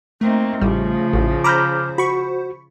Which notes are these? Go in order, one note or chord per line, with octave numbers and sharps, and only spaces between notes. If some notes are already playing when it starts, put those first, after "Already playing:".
A3 A#3 C4 D#4
A1 C#3 F3 G3
A1
C5 A#5 B5 D6 F6 G6
F#4 B5 C#6